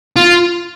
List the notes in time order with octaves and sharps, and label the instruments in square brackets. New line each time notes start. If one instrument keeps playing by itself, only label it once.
[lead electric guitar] F4